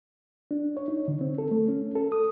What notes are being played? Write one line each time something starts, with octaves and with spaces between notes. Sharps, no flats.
D4
C#5
D#4
D3
C4
A4
A3
C#4
A4
D#6